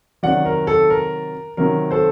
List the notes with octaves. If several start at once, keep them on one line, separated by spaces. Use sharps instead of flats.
C3 D#3 F#3 D5 F#5
A#4
A4
A#4
C3 D#3 F#3 A#4
A4 C5